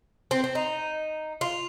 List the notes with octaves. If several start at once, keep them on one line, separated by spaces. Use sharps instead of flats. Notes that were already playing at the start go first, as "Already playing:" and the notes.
C4
C4
D#4
F4